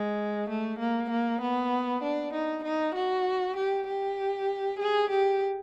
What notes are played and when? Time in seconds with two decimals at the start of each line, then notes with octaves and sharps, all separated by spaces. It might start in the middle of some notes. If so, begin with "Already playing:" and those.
Already playing: G#3
0.49 A3
0.79 A#3
1.10 A#3
1.41 B3
2.03 D4
2.33 D#4
2.64 D#4
2.95 F#4
3.56 G4
3.87 G4
4.79 G#4
5.10 G4